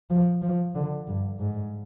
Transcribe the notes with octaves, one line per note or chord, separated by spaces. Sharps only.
F3
F3
D3
G2
G#2